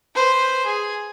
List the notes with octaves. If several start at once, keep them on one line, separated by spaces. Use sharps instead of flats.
B4 C5
G#4